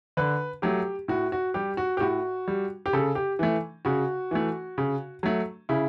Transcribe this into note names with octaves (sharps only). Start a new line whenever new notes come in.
D3 B4
F#3 A3 G4
A2 F#4
F#4
G3 G4
F#4
G4
A2 F#4
G3
G4
C#3 A4
G4
E3 A3
C#3 F#4
E3 A3
C#3
F#3 A3
C#3 E4